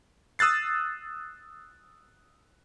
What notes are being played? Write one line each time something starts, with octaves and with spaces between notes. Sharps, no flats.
D#6 E6 F#6 A6 C7